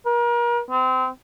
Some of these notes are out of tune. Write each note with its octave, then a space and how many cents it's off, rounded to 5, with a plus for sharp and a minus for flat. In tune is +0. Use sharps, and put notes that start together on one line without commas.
A#4 +35
C4 -25